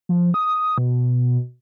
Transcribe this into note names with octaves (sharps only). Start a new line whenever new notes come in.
F3
D#6
B2